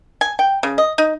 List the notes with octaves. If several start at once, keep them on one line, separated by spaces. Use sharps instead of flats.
G#5
G5
C#3
D#5
D#4